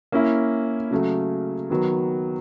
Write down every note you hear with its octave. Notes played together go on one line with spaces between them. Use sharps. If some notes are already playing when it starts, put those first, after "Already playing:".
A#3 C#4 E4
C#3 F#3 A3
D#3 F#3 B3